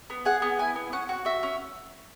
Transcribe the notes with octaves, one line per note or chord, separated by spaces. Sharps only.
B3
G#4 F#5
B3
E4 G#5
B3
C#4 F#5
F#4
F#4 E5
C#4